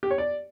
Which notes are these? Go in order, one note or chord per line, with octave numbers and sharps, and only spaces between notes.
G4
C#5
D5